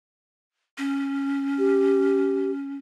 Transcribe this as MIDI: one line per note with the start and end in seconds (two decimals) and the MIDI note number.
0.78 2.76 61
1.59 2.51 67